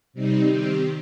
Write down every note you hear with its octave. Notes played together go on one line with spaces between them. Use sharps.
C3 G3 C4 D#4
D#3 C4 G4